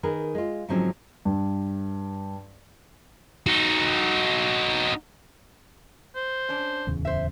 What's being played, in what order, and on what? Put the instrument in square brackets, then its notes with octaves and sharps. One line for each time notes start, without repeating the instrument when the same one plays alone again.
[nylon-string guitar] D#3 G#4 A#4 B4
G#3 F4
G#2 D3 F3 F#3 C4 C#4
[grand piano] G2
[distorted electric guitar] D#4 F#4
[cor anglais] C5
[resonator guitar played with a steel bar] C#4 D4
[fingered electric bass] D1 E2 C#3
[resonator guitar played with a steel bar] C5 E5